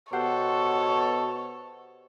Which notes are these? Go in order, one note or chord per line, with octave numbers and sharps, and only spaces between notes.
B2 G4 A4 C5 C#5 F#5